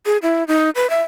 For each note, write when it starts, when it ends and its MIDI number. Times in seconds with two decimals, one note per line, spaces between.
0.06 0.17 68
0.23 0.44 64
0.48 0.70 63
0.75 0.89 71
0.90 1.01 76